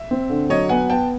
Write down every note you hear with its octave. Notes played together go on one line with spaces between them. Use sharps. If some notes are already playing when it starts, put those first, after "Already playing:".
Already playing: E5
C4
D3
F#3 C#5 D#5
B3 F#5 G#5
B3 G5 A5